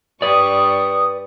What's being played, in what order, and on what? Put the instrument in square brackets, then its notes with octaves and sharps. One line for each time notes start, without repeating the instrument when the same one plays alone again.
[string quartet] G2 G3 C#6 [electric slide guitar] B4 D5 [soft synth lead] D#6